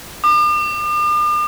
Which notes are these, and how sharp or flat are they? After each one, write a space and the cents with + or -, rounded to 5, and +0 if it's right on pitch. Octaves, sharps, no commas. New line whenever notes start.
D6 +45